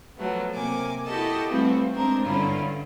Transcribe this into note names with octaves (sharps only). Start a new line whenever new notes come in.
F3 F#3 A3 B3
C3 A#3 G#5 D6
E4 F#4 G4 A4 D#5 A5
E3 F3 G3 A3 C4 F#4
G#3 C4 D4 A#4
G2 D3 C#4 E4 F4